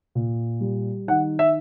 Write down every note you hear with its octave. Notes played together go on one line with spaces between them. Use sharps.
A#2
G3
D#3 F#5
E5